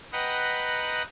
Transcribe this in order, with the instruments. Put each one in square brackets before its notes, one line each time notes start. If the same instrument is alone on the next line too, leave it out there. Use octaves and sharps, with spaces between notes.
[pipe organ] B4 D#5 F#5 G5 A#5 B5